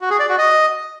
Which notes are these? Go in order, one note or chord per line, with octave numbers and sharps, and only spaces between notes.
F#4
G#4
D5
F#4
D#5